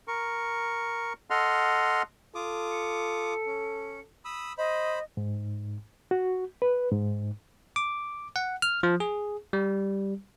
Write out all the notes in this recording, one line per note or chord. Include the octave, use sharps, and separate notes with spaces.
A#4 C#6
A4 D#5 F#5 C6 F6
F4 A4 D6 D#6
C#7
C#4
B5 D#6 E6
C5 D#5 B5
G#2
F#4
B4
G#2
D6
F#5
F6
F3
G#4
G3